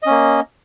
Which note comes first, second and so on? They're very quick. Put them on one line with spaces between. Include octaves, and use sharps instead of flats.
D#5 C#4 A#3